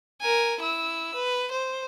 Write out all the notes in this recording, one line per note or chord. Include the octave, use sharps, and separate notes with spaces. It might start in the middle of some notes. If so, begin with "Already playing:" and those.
A#4 G#5
E4 E6
B4
C5